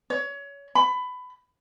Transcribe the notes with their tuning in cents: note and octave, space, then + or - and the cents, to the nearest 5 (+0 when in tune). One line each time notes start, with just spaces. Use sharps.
C#5 +25
B5 +20